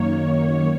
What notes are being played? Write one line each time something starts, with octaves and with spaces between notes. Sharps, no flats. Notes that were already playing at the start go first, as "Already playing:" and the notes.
Already playing: F#2 D#3 A#3 C#5